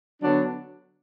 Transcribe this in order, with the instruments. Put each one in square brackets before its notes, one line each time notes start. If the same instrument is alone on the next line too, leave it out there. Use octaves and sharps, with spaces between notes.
[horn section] D3 F#3 B3 D4